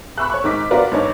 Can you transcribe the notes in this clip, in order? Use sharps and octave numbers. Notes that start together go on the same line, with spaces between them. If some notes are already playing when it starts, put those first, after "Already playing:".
B5 C#6 E6 F#6
C#5 C#6
G#2 D#3 D6 B6
B3 D4 F4 F#4 A#4 D5
G2 D#3 C#5 D6